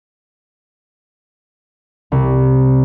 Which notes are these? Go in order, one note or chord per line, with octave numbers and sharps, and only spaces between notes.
C2